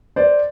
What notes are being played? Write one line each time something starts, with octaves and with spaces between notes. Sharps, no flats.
C5 D5